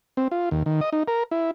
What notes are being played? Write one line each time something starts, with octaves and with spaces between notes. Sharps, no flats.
C4
F4
D#2
D#3
D#5
D#4
A#4
E4